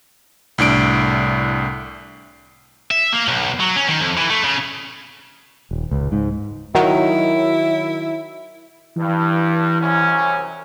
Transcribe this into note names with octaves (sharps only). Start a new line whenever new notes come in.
C2 A2 D4 D7
E5
A#3
B1
F#3
C#4
D#3
F2
E3
A3
C#3
D#1
C#2
G#2
D#3 F#3 E4
G2 E3
C2 F#2 C#4